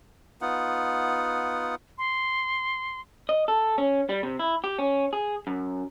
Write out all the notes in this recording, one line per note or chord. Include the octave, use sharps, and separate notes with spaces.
B3 D#4 F4 F#5
C6
D#5
A4
C#4
G3
C3
E4
G4
C#4
G#4
F#2